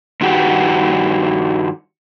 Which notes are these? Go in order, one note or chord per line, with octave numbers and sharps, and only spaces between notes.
G2 D#3 F#4 G4